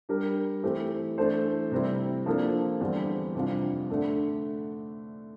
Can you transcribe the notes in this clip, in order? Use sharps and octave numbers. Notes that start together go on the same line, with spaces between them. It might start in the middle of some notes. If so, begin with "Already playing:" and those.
G3 D4 G4 A#4
E3 A3 C4 G4
E3 A3 D4 A4 C5
C3 G3 C4 E4
F3 A#3 D4 A4
E2 D3 G3 C4
F2 C3 G3 D4 F4
D3 A3 D4